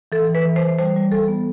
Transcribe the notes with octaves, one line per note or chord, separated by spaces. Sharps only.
E3 A4
E3
B4
E3
C5
E3
G3 C5
G3
G3 A4
B3